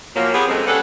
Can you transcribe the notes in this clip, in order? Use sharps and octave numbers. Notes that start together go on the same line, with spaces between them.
A#2 F3 F#3 A#3
B3 C4 G4 G#4
F#2 F#3 G#3 A3 C4
G3 C#4 D4 A4 B4 F#5